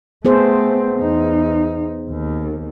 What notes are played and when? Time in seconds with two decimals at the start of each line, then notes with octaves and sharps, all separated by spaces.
0.25 A3 B3 C4 G#4 C5
0.99 E2 D#4
2.10 D#2